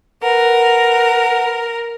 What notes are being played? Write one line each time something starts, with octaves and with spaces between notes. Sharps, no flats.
A#4 B4 F#5